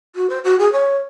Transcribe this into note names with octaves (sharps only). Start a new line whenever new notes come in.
F#4
C5
F#4
G#4
C#5